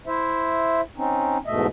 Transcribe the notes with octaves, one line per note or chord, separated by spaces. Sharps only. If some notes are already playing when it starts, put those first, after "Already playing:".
E4 C5 E5
C4 C#4 D#4
E2 G#2 B2 A3 D#5 E5